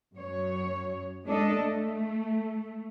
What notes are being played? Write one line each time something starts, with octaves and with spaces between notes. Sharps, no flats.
F#2 C#5
G#3 D4 A4 D#5
A3